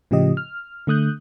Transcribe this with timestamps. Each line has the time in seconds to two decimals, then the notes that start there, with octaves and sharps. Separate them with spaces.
0.11 A2 C#3 F3 G4 D#5
0.37 F6
0.87 D3 A3 D#6 F#6 G6